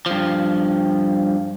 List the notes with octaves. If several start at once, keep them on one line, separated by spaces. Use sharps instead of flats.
G2 F3